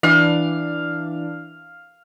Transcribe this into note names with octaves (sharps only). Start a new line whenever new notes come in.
E3 D4 F5